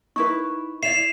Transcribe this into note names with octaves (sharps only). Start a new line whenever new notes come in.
D#4 E4 B4 C#6
E4 D5 E5 C7 E7 F7